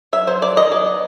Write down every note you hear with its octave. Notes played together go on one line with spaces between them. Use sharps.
F#3 E5
F#3 C5
F#3 D5
D#3 D#5
F#3 D5
B3